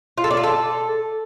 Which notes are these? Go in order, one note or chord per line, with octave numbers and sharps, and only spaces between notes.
F4
A4
D5
F4
A4